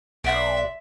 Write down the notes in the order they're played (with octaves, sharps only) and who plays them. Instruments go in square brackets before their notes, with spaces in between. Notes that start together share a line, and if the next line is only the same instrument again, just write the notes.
[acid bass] B1 [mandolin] D5 F#5 C6 [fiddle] E5